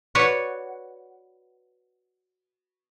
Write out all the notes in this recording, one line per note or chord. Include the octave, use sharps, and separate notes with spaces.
F#4 B4 C#5 D5 F#5